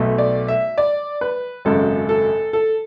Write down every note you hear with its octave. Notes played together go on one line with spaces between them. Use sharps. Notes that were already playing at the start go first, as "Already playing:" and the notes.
Already playing: B1 B2 A3
D5
E5
D5
B4
G#1 F#2 C#3 G#3 A4
A4
A4